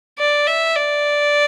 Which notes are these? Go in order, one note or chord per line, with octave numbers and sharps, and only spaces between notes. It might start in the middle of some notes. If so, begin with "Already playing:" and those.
D5
E5
D5